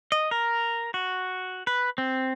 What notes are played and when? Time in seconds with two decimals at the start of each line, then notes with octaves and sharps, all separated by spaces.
0.12 D#5
0.31 A#4
0.94 F#4
1.67 B4
1.98 C4